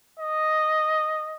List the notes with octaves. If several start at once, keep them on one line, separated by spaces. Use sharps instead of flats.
D#5